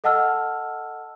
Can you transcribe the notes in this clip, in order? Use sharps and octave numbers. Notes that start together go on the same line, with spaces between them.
A4 D#5 F#5 A5 E6 F6